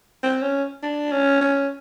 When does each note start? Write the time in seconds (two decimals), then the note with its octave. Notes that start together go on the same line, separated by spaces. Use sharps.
0.23 C4
0.42 C#4
0.83 D4
1.12 C#4
1.41 C#4